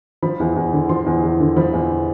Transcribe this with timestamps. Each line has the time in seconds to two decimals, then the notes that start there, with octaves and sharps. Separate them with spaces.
0.23 F3 B5
0.40 E2
0.56 E2
0.73 D3
0.89 F3 C6
1.06 E2
1.23 E2
1.40 D3
1.56 F3 B5
1.73 E2